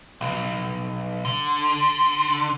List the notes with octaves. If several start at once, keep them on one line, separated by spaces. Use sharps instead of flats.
B1
D3